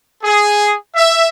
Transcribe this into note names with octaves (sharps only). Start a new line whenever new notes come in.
G#4
E5